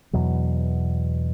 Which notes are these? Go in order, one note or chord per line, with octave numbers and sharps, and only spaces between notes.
E2 B2 F#3